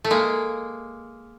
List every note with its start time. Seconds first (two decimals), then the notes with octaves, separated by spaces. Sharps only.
0.04 A3
0.10 G#3 A#3